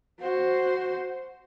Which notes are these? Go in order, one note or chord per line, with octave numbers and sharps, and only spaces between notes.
F#4 C5